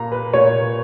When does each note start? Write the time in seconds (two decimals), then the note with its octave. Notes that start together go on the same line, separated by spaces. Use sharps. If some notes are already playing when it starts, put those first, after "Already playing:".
Already playing: A#2 A#5
0.12 B4
0.33 A#2 C#5